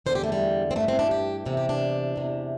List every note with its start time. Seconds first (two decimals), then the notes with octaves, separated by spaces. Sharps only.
0.06 E2 D3 C5
0.15 G4
0.24 A3
0.32 G3
0.71 C4
0.76 G2 E3 A3
0.88 C4
0.99 D4
1.11 G4
1.45 E2 C3 E3 A4
1.57 G4
1.69 D4
2.16 E2 C3 E3